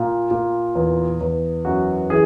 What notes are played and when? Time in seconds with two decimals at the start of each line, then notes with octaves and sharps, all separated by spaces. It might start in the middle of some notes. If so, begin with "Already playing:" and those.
Already playing: A#2
0.31 A#2
0.75 E2
1.21 E2
1.65 F#2 F#4
2.10 E3 G#4